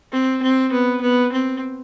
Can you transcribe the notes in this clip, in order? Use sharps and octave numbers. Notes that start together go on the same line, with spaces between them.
C4
C4
B3
B3
C4